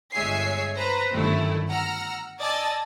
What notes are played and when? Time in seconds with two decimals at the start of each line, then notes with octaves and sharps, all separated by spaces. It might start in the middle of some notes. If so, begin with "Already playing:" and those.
0.13 G1 G#3 C#5 E5 G#5 C7
0.74 B4 C5 A#5
1.11 G1 F#2 D#3 A3 E4
1.68 F#5 A#5 E6 F6
2.40 D5 D#5 G#5 A5 E6 A6